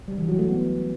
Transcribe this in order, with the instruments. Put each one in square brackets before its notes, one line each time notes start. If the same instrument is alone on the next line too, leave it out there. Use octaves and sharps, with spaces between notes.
[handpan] G3
E3
F#3
A3
B3